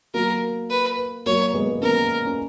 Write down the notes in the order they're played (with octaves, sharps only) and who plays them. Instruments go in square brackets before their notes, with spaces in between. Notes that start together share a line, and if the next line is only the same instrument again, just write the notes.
[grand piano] F#3 A#3 [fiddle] A#4
[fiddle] B4
[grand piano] F#3 A#3 [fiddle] C#5
[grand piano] G#3 B3
B3
[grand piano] A#3 C#4 [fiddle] A#4
[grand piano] C#4